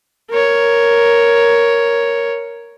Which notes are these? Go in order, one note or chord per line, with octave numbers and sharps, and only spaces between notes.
A#4 C#5